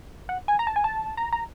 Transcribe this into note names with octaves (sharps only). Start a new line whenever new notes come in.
F#5
G#5
A#5
A5
G#5
A5
A#5
A#5